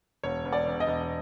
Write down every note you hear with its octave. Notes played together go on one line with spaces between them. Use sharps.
E1 C#5
E1
D5
E1
D#5
E1